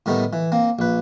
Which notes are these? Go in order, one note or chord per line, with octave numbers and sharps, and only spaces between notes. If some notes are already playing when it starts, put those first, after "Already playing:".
A2 D#3 G3 A3 B3 D#4
E3
A#3 C4
A#1 B4